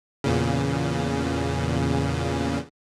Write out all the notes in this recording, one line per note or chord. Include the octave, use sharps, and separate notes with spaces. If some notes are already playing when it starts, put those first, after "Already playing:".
E2 A#2 C#3